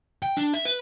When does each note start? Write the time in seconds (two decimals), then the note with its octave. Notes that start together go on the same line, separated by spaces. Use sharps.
0.23 G5
0.37 D4
0.54 E5
0.65 B4